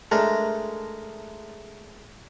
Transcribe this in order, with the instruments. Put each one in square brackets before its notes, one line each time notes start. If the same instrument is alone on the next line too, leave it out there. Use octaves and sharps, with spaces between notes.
[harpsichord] G#3 D4 A#4 [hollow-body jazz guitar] A3